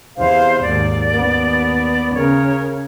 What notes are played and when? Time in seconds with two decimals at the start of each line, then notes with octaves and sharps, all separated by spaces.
0.17 E2 C3 E4 C5 F5
0.63 D#2 G#2 D5
1.13 D#2 B3
2.15 C#3 A#4 C#5